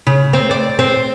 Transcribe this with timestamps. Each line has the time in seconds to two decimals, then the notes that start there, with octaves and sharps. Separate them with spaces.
0.07 C#3
0.33 C4
0.51 D5
0.79 C4